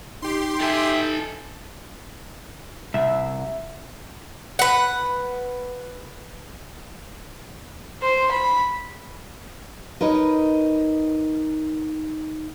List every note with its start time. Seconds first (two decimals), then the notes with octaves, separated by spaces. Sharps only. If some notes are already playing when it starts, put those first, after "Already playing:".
0.22 D#4 G4 C6
0.61 A4 E5 G5 G#5
2.94 C2 E5
4.59 B4 F#5
8.02 C5
8.31 B5
10.01 D#4 A#4 B4 C#5 D#5